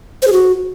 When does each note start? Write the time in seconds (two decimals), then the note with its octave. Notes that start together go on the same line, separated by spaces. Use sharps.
0.22 C5
0.27 G#4
0.32 F#4